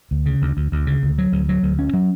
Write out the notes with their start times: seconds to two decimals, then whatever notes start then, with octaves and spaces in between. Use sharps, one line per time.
0.11 D2
0.26 C#3
0.42 D2
0.57 D2
0.72 D2
0.87 C#3
1.03 D2
1.18 F#3
1.32 D2
1.49 F#3
1.63 D2
1.79 C#4
1.94 F#3